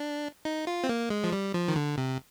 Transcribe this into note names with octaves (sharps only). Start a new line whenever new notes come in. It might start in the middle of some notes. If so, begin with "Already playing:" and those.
Already playing: D4
D#4
F4
C4
A#3
G#3
F3
G3
F3
D#3
D3
C3